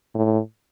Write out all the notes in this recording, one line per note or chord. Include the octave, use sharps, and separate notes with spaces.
A2